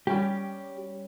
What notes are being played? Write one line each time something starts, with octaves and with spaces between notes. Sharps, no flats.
G3 C#4 G4